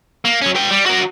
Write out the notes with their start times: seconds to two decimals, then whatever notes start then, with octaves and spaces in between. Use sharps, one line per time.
0.25 A#3
0.42 F#3 C#4
0.55 B4 G5
0.71 G3
0.86 F#4 A#4